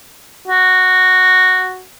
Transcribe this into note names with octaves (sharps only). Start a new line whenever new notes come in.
F#4